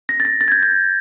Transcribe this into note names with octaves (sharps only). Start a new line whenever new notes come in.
A#6
A6
A#6
A6
G#6
G6
G6